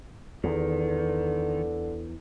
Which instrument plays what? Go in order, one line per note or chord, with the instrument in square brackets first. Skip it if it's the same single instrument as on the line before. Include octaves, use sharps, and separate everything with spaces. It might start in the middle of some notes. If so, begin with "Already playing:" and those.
[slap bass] E2 [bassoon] D3 [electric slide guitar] D#3